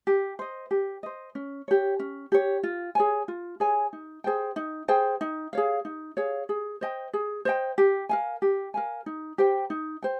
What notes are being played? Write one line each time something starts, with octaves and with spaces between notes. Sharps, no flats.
G4
C5 D#5
G4
C5 D#5
C#4
G4 C#5
C#4
G4 C#5
F4
G#4 C#5 G#5
F4
G#4 C#5 G#5
D#4
G#4 C5 G5
D#4
G#4 C5 G5
D#4
G#4 C#5 F5
D#4
G#4 C#5 F5
G#4
C5 D#5 G5
G#4
C5 D#5 G5
G4
A#4 F5 G#5
G4
A#4 F5 G#5
D#4
G4 C5 G5
D#4
C5 G5